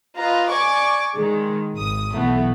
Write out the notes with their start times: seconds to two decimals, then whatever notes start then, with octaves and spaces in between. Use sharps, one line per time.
0.19 F4 B4 D#5 A#5
0.49 D5 G#5 C#6 D6
1.16 D#3 G#3
1.74 G#1 D#6
2.16 B1 E3 A3 B3